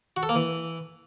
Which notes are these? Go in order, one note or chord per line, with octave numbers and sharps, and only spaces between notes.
F#4
A4
A#3
E3